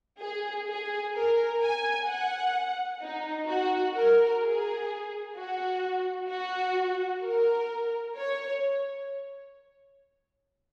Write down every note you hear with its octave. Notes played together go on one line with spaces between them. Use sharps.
G#4
G#4
A#4
G#5
F#5
D#4
F#4
A#4
G#4
F#4
F#4
A#4
C#5